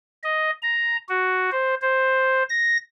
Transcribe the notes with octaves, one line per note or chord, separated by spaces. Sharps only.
D#5
A#5
F#4
C5
C5
A#6